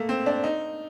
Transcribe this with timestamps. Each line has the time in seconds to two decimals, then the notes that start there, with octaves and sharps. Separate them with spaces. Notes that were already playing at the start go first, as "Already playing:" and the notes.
Already playing: A3 A#3
0.09 C4
0.26 D4
0.44 D#4